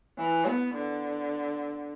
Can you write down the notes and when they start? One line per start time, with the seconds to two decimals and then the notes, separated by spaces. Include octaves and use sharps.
0.18 E3
0.46 B3
0.74 D3